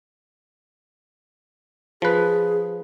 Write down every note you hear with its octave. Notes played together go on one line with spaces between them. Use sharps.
F3 G#4 B4